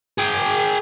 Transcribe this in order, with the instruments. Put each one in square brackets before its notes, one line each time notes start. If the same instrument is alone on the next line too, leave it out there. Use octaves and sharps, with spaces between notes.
[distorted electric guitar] G#4 G5